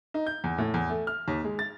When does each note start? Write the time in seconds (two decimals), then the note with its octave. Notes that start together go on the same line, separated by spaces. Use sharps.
0.14 D#4
0.27 G6
0.44 E2
0.58 A2
0.74 E2
0.89 A3
1.07 F6
1.28 D#2
1.44 G#3
1.59 A6